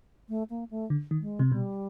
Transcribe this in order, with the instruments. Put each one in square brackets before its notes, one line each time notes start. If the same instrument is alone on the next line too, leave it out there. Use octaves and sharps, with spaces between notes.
[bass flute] A3
A#3
A3
[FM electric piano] D3
D#3
[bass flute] G#3
[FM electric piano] C3
[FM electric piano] B2 [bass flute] G3